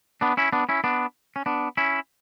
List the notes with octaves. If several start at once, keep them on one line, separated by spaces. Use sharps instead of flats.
B3 D4
C#4 E4
B3 D4
C#4 E4
B3 D4
C#4
B3 D4
C#4 E4